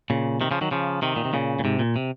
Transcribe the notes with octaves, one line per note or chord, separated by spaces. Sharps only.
A#2 C#3
C3 D#3
C#3 F3
D#3 F#3
C#3 F3
C3 D#3
A#2
C3
A#2 C#3
A#2
G#2 C3
A#2
C3